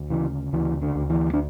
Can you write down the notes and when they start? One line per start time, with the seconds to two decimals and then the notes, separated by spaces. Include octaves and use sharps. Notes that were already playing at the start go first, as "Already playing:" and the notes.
Already playing: D2
0.10 C#3 E3
0.53 D2 E3
0.82 D3
0.95 D2
1.10 E3
1.33 D4